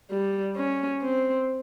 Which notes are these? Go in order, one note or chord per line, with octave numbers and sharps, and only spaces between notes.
G3
C#4
C4